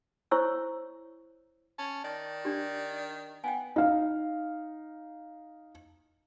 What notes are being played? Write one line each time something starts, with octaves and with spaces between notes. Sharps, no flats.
E4 C5 C#5 C#6 E6
C#4 A5
D#3 D5
D4 G4
B3 G5 G#5
D#4 F5